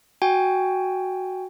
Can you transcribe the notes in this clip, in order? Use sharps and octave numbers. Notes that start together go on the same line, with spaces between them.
F#4 G5 G#5